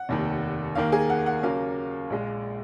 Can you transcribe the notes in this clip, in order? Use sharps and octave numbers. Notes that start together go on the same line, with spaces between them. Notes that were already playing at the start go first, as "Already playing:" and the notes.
Already playing: F#5
F1 D#2 D#3
D#2 D#3 A#3 F5
G#4
F#5
F#5
D#2 C#3 F#3 A#3 F5
A#1 A#2 G#3